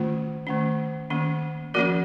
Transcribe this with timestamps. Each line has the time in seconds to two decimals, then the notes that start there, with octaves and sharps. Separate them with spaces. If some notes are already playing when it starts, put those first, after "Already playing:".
Already playing: D#3 A3 C#4 F4
0.47 D#3 A3 C#4
1.10 D#3 A#3 C#4
1.74 F3 A#3 C#4 F#4 A#4